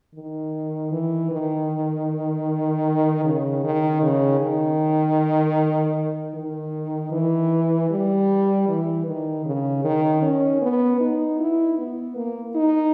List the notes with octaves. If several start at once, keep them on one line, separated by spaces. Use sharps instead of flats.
D#3
E3
D#3
C#3
D#3
C#3
D#3
D#3
E3
G3
E3
D#3
C#3
D#3
C#4
B3
D#4
E4
B3
A#3
D#4